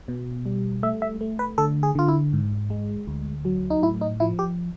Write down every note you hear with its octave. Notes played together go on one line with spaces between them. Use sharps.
B2
G3
A3 E5
E5
A3
B4
D3 A4
G#4
D3 F4
E4
G#2
G#3
D2
F#3
D#4
A2 E4
D#4
F3 E4
G4